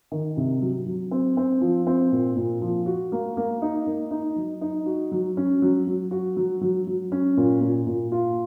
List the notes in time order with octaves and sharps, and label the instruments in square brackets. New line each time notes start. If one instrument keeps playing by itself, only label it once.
[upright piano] D#3
C3
F#3
F#3
C4
C4
F3
C4
A#2
A#2
F3
F#4
A#3
A#3
D#4
A#3
D#4
F#3
D#4
F#4
F#3
C#4
F#3
F#3
F#4
F#3
F#3
F#3
C#4
A#2
A#2
A#2
F4